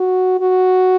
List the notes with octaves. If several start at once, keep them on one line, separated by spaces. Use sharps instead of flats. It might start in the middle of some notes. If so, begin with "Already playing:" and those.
Already playing: F#4
F#4